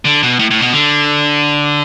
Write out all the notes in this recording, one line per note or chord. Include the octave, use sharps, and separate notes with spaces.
D3
B2
A2
A2
B2
D3